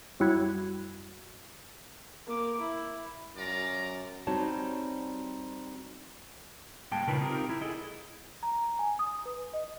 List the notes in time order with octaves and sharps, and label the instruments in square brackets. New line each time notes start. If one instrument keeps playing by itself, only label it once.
[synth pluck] F#2 G3 E4 F#4 B5 G#6
[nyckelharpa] A#3 D6
E4
[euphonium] F#2 [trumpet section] F4 D5 A#5
[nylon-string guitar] G3 C4 D#4 F#4 C#5 A5
[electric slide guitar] G#2 G3 A#3 G5 A5
A#2 C#3 D#4 F4 A#4 B4
C4 D#4 F4 G4 A#4
E4
E4 G#4 A4 D#5
[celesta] A#5
G#5
D#6
B4
D#5